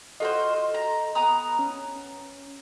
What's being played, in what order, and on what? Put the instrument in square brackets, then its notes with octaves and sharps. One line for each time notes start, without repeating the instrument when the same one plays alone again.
[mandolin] F4 F#4 C5 [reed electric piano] A4 D#5
[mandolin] A#5
B3 A#5 D#6
[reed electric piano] C#4